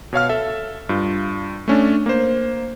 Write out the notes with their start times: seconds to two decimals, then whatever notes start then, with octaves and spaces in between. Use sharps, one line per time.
0.13 B2 C#5 F5 F6
0.29 A4 E5
0.89 G2 F4
1.68 A3 C#4 D4
2.06 A#3 C5